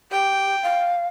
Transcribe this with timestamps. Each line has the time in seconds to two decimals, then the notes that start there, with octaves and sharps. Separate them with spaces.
0.11 G4 G5
0.62 F5